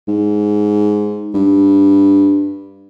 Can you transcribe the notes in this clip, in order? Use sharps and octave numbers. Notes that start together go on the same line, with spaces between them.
G#2
G2